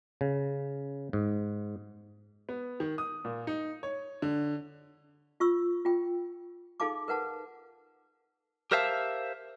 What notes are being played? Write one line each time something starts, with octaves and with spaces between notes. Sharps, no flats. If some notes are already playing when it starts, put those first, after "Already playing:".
C#3
G#2
B3
D#3
D#6
A#2
D#4
C#5
D3
F4 C#6 E6
F4 G5
D#4 G#4 A4 F5 A5 D6
A#4 B4 F#5 A5
G4 A#4 C5 E5 F5 A5